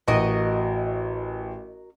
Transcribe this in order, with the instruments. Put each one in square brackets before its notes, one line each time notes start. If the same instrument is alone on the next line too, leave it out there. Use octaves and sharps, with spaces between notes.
[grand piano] A1 [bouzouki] F#4 A#4 D#5